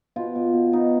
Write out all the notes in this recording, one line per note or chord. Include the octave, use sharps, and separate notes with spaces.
B2 F4
B2
B2
B2 D#4